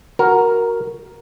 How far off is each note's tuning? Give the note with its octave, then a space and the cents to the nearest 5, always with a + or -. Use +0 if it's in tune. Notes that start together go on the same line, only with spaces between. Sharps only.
F#4 +0 A#4 +0